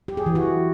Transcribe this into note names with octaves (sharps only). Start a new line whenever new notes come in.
G4
G#4
E3
F#4